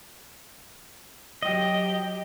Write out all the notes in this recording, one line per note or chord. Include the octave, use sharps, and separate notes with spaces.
F#3 G4 D#5